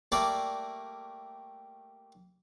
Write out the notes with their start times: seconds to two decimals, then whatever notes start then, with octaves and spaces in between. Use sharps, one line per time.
0.12 G3 A3 A#3 D5